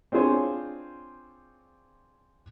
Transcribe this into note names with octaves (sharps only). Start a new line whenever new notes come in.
C4 D4 F4 G#4 C5 C#5